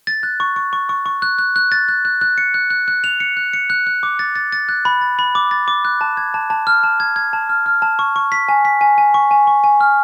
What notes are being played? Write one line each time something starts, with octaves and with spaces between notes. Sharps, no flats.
A6
F#6
C#6
C#6
C#6
C#6
C#6
F#6
F#6
F#6
A6
F#6
F#6
F#6
C#7
F#6
F#6
F#6
F7
C#7
F#6
C#7
F#6
F#6
D6
A6
A6
A6
F#6
B5
A6
B5
D6
A6
D6
F#6
A5
G#6
A5
A5
F6
A5
G#6
G#6
A5
F6
F6
A5
C#6
C#6
B6
G#5
B6
G#5
G#5
C#6
G#5
C#6
G#5
F6